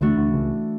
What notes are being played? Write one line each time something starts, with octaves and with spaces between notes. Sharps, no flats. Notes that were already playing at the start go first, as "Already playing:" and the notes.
D2 D3 E3 A3 D4 F#4
D2 D3
C#2 C#3